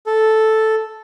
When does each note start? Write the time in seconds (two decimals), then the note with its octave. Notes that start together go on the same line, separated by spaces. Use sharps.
0.07 A4